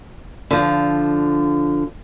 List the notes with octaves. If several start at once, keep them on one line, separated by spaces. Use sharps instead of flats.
D3 F3